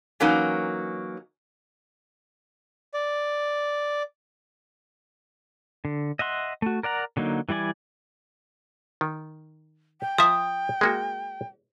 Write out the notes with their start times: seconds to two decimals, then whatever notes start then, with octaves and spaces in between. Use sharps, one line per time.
0.20 E3 F#3 A#3 C#4 D#4
2.94 D5
5.85 D3
6.19 D#5 E5 F#5 C6
6.62 A3 F#4
6.83 A#4 D5 F#5 A#5
7.17 D3 F#3 A#3 D#4
7.49 E3 G3 E4 D5 G#5
9.01 D#3
10.01 G5
10.18 F3 E5 D#6
10.81 G#3 A#3 F#4